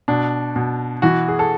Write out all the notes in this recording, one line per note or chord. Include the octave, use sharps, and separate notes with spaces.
B2 D4
B2
E3 F#4
G#4
A4